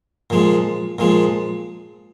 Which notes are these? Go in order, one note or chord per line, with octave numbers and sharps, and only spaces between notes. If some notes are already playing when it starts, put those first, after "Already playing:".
A#2 F3 G#3
A#2 F3 G#3